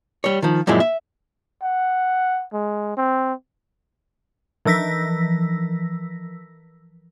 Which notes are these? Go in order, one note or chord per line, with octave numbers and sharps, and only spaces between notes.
G3 C#5
D#3 F3
F#2 A#2 F3 G#3 E4
E5
F#5
G#3
C4
E3 F3 E6 A#6 B6